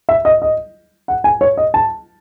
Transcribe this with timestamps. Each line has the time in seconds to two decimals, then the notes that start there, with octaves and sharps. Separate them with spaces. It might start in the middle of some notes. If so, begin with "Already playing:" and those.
0.09 E5
0.25 D#5
0.42 D#5
1.08 F#5
1.24 G#5
1.41 C#5
1.57 D#5
1.74 A5